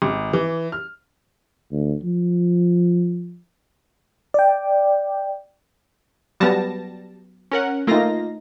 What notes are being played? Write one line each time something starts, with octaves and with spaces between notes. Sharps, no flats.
G#1
E3
F6
D2
F3
D5 G5
F#3 G3 B3 A5 A#6
C#4 A#4 F#5
A3 A#3 D#4 F4 A#6